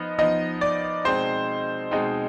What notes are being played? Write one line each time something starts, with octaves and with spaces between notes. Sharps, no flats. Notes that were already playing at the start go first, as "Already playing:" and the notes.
Already playing: F3 B3 D#4 D#5
F3 B3 D#4 D#5
D5
B2 G#3 C4 D#4 C5
B2 G#3 C4 D#4